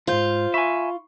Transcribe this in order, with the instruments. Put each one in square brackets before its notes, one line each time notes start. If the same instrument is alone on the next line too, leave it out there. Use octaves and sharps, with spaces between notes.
[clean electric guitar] C#2 G#2 [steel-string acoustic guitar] F4 [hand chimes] C5 G6
[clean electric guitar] E5 G#5 [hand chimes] B5 C#6